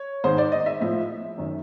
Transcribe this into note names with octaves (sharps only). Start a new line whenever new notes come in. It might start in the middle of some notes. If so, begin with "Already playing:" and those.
Already playing: C#5
G#2 D#3 C5
D5
D#5
E5
A2 F3 E5
F#2 D#3